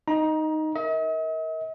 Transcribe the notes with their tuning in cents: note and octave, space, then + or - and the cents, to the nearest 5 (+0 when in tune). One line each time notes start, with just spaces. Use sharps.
D#4 +0 A#5 +25
A#4 +0 D#5 +45